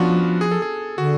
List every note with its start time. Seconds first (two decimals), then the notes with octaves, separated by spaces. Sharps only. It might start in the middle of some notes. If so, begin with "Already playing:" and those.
Already playing: F3 B3 C#4 D4 F4 F#4
0.41 G#4
0.51 A4
0.62 G#4
0.98 D3 F#4